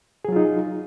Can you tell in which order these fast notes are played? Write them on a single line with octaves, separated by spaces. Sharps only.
G#4 F#3 F4 D#4